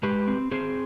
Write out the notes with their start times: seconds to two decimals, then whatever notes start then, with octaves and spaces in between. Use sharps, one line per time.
0.03 G#3 G4 B4
0.27 C4
0.51 C4 G#4 C5